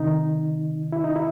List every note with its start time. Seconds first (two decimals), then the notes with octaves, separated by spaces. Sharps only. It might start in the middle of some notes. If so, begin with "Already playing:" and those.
Already playing: C3 D#3 D#4
0.92 E4
1.04 D#4
1.16 E4